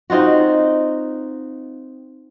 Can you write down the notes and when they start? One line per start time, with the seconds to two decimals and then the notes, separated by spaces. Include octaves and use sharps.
0.10 C4 D#4 F4 F#4